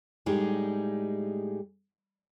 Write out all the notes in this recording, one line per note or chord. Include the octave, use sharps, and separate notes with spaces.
A2 G3 G#3 D#4 G4 G#4